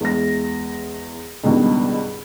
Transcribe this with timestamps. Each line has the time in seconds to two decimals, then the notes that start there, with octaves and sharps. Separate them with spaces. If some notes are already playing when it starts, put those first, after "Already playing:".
0.01 E2 G#3 A#6
1.44 C#2 G2 B2 D#3